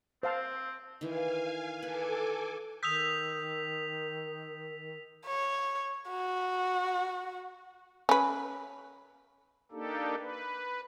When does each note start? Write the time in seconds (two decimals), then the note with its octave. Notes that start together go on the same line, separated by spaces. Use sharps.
0.23 C4 C5 F5 A5
1.01 D#3 E3 F5 G#5
1.82 A4 B4 G#5 D6
2.83 D#3 D#6 E6 G6 B6 F7
5.26 C#5
6.10 F#4
8.09 C#4 B4
9.72 A#3 D4 D#4 G4 A4
10.20 B4